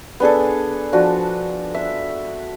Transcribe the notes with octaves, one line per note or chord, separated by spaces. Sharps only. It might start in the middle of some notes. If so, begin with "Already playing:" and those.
B3 D4 G#4 A4
F3 D4 F#4
E5